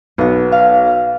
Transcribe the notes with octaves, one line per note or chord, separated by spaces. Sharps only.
B1 B3 F#4
F5